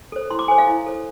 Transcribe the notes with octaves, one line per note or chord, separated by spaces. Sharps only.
A4 C5
E4 C6
D6
A4 C5 G#5
F5
E4
A4 C5